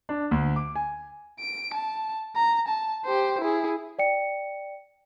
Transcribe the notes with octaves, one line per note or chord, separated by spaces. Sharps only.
D4
D2
D6
G#5
D7
A5
A#5
A5
G4 C5
E4 G#4
D5 G5 C#7